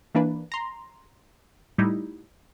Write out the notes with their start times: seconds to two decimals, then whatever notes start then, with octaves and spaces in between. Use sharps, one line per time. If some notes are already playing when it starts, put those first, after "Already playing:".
0.15 E3 A#3 D4 B4
0.52 A#5 C6
1.78 A2 G3 D#4 E4